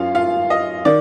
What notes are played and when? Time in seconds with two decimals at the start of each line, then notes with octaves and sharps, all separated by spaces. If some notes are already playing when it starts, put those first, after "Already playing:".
Already playing: F#2 C#4 F4 F5
0.15 F4 F5
0.50 D#5
0.85 D#3 D5